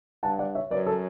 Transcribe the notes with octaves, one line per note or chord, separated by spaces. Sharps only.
G2 F#5 A5
D5 F#5
C#5 E5
F#2 B4 D5
A4 C#5